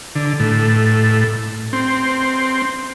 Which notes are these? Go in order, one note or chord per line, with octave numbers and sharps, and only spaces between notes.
D3
A2
C4